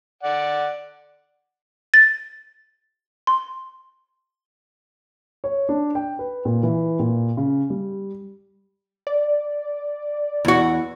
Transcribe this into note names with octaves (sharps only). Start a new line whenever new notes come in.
D5 F#5
A6
C6
C#5
D4
G5
B4
A#2
E3
A#2
C#3
G3
D5
E2 F#4